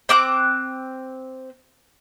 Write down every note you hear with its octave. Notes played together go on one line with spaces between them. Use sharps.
C4 D6 F#6